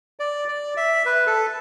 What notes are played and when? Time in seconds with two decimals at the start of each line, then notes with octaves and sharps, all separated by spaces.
0.19 D5
0.48 D5
0.77 E5
1.05 B4
1.27 A4